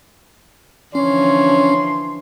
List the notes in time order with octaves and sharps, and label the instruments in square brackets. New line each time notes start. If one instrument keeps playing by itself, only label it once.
[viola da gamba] D3 E3 F3 [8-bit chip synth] C#4 [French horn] C#5 [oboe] C6